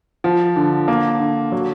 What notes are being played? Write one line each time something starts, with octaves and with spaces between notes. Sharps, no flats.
F3
D3
A#3
D3
F#3